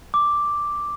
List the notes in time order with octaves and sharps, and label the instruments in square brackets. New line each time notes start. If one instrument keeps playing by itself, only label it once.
[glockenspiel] D6